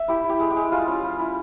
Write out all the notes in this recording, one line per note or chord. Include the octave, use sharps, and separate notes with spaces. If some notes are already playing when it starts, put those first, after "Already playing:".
Already playing: E5
E4 G4
E4
G4
G#3
G4
G#3
G3 F4
C#4
G3
E4